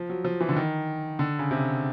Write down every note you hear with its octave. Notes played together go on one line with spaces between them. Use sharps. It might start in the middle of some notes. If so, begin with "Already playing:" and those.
Already playing: F3
F#3
F3
E3
D3
D#3
D3
C#3
C3